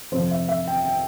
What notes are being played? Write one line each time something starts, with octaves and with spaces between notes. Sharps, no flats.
F2 C3 F3 C5
E5
E5
G5
G5